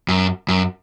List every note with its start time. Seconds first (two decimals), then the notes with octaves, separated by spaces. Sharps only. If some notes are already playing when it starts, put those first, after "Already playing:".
0.08 F#2
0.48 F#2